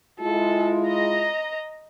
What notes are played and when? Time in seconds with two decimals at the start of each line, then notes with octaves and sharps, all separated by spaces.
0.20 G#3 E4 F4 A4
0.88 D#5 A#5